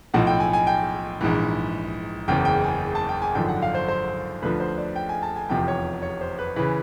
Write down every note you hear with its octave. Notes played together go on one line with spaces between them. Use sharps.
B1 A2 F3 F#5
G5
G#5
G#5
G5
A#1 G#2 E3
F#1 E2 C#3 G5
G5
G#5
A5
G5
G#5
G#1 F#2 D3 F3 G5
F#5
F5
C5
C5
D2 D3 F3 B4
C5
D5
G5
G#5
A5
G#5
F1 E2 C3 F3 G5
C#5
C#5
C5
B4
C#3 E3 B4